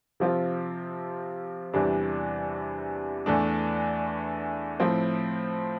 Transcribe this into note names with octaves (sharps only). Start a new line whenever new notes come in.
C3 F3 C4 F4
E2 C3 E3 G3 D4
E2 E3 A3 D4
A2 F3 C4